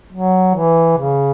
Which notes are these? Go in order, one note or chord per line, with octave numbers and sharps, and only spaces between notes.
F#3
E3
C#3